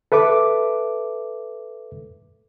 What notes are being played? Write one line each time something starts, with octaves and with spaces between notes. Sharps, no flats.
A4 B4 E5 D6